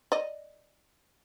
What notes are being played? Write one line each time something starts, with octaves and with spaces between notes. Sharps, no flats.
D5 D#5